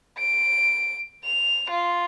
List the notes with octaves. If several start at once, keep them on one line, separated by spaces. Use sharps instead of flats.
D7
F7
F4